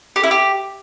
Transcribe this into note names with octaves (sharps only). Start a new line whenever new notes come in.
G4
E4
G4